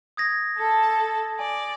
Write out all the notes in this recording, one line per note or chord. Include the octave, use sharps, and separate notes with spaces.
D#6 G#6 A#6
A4 A5
D5 G#5